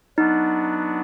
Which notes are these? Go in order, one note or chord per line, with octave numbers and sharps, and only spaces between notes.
F#3 B3 D4 D#4